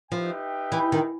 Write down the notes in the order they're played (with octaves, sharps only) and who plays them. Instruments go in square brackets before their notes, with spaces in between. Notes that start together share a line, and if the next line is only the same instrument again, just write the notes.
[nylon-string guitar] F3 [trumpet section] D#4 G4 B4 E5 G5
[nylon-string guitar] E3
D#3